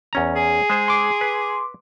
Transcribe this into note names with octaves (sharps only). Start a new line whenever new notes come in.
E2 C#4 A#5
G#4
G#3 C5
C6 D6
B4